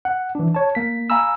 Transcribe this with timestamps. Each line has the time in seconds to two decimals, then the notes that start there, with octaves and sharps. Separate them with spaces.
0.05 F#5
0.35 E3 D4
0.55 C#5 A5
0.75 A#3 B6
1.10 F5 G#5 A#5 B5 E6